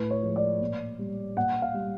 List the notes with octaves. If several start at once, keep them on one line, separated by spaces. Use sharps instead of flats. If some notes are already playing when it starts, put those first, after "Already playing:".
Already playing: A2 B4
C#5
F3 G#3
D5
A#2
G3
A#2 F#5
F5
G3